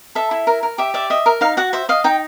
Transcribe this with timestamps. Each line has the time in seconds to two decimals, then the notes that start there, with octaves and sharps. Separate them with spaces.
0.15 A4 E5
0.31 E4
0.47 A#4
0.63 A#4
0.78 G4 E5
0.94 D5 E5
1.10 D#5 E5
1.26 A#4
1.41 D#4 F5
1.57 F#4 F#5
1.73 C5 E5
1.89 D#5 F5
2.04 D#4 G5